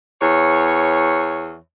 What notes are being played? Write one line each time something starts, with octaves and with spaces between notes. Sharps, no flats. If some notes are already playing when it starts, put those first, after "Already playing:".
E2 C#5